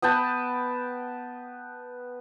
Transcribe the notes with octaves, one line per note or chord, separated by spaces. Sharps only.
B3 B4 G5 A5